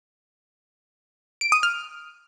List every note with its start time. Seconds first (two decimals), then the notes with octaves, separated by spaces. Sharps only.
1.41 D7
1.52 D#6
1.63 F6